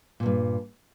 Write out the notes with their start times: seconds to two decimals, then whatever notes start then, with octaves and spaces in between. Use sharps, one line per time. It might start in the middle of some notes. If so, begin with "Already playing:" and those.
0.20 A#2
0.23 E2
0.26 G2